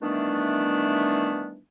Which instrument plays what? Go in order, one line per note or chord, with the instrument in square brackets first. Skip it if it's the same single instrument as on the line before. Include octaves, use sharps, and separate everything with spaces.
[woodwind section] D#3 E3 G3 A3 B3 D4